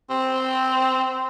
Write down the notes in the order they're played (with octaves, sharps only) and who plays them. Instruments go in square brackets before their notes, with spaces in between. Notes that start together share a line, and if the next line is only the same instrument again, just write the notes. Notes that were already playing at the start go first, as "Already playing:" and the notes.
[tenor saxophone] C4